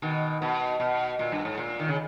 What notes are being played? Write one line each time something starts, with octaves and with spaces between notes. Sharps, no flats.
B2 D#3
B2
B2
A#2
G2
G#2
A#2
D#3
C#3